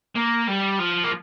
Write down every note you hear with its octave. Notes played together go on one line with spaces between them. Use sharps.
A#3
G3
F3
A#3